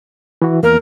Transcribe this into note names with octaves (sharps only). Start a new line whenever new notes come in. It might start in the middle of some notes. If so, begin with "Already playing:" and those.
E3 F#4
E2 A#3 A#4 F6